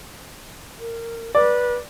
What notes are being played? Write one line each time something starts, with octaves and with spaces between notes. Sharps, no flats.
A#4
B4 D5